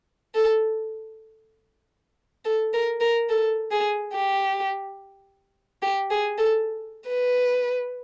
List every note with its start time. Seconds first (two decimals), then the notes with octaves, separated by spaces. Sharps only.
0.35 A4
2.45 A4
2.73 A#4
3.01 A#4
3.29 A4
3.71 G#4
4.13 G4
5.82 G4
6.10 G#4
6.38 A4
7.08 B4